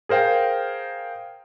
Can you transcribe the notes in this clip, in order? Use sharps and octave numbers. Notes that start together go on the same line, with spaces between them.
G#4 A#4 C5 F5 G5